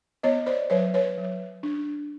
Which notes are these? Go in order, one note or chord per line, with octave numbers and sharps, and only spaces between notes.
B3 C#5 D#5
C5 D5
F#3 B4 C#5
B4 C#5
F#3
D4